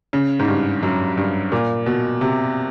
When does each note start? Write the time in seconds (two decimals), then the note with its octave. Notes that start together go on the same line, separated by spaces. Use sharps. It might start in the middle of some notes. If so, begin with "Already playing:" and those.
0.13 C#3
0.39 G#2
0.48 G2
0.83 F#2
1.17 G2
1.52 A#2
1.86 B2
2.21 C3